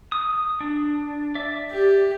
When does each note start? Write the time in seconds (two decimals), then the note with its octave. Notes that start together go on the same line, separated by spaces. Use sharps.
0.12 D#6
0.61 D4
1.35 D5 E5
1.71 G4